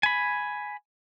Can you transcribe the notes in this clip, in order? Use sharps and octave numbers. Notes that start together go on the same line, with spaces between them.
G#5 B5